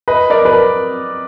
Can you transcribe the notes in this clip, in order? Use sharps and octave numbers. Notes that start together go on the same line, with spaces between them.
B4 D#5
A#4 D5
B4
A#4